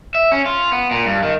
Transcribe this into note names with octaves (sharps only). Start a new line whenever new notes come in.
E5
C#4
F4
B3
A#2
G2
D#3